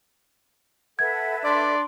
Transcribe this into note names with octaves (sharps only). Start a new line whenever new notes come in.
A4 B4 E5 F#5 G#6
D4 D5 C6